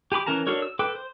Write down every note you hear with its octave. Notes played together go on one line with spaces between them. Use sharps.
G4 G#5 B5 D6
E3 C#4 A#4 A5 A#5
D4 F#4 A4 A#4 C#5
E6
A4 B4 G5 D6
C5